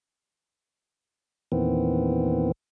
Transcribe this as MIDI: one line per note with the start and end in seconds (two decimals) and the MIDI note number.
1.52 2.52 40
1.52 2.52 46
1.52 2.52 51
1.52 2.52 52
1.52 2.52 59
1.52 2.52 60